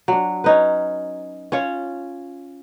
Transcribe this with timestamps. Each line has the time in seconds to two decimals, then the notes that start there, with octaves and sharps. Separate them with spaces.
0.08 F#3 D4
0.44 C#4 D#4 B4
1.52 C#4 F4 C#5